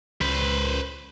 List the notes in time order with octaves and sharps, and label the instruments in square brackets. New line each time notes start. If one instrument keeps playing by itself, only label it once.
[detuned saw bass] C#2 [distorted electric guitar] B4 C5